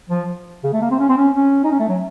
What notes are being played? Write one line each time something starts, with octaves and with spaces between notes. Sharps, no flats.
F3
C#3
A3
A#3
C4
C#4
C4
C#4
C#4
D#4
C#4
A3
F#3